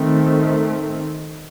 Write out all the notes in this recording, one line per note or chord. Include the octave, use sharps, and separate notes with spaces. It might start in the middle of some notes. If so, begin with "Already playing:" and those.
Already playing: D#3 A3 C4